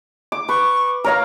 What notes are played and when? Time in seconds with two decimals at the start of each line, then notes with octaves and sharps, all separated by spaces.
0.32 D6
0.49 B4 C#6
1.04 A#4 C#5 F5 A#5